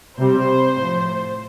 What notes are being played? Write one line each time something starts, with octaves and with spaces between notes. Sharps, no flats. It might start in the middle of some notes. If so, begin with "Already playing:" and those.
C3 G3 C5
A2 F3